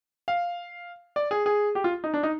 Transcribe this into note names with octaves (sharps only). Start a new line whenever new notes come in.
F5
D5
G#4
G#4
G4
F4
D#4
D4
D#4